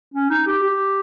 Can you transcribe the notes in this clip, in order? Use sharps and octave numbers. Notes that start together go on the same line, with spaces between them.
C#4
D#4
G4
G4